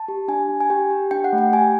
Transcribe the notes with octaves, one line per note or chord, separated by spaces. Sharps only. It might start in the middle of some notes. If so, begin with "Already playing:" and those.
Already playing: A5
G4
D4 G#5
D4
G#5
G4 G5
G4
D4 G5
F#5
A3
G5
G4 G#5